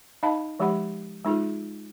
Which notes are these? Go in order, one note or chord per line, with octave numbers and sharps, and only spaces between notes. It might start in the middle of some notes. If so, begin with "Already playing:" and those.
D#4 D#5 F5 A5 B5
F3 G#3 G4 F#5 B5
G#3 D#4 F4 G#4